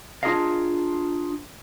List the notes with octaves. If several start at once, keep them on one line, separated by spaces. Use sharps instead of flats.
D4 F4 G#4 A#4 D#5 F5